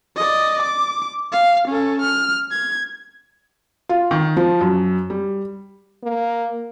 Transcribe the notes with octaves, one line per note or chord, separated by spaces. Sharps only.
D5 D#5
D6
F5
C#4 A4
F6
G#6
F4
D#3
F3
F#2
G3
A#3